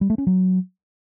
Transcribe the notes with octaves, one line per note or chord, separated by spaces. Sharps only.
G3
A3
C#4
F#3